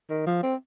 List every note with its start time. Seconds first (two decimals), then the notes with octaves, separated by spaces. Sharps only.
0.10 D#3
0.27 F3
0.43 C4